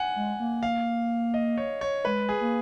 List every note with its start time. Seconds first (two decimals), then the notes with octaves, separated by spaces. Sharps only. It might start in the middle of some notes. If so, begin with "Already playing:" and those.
Already playing: F#5 G#5
0.16 G#3
0.40 A#3
0.63 F5
1.34 D#5
1.58 C#5
1.81 C#5
2.05 G#3 B4
2.29 G#4
2.41 A#3